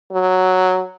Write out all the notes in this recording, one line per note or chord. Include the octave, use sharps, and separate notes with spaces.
F#3